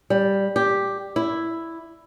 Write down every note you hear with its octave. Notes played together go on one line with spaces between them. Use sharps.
G3
G4
E4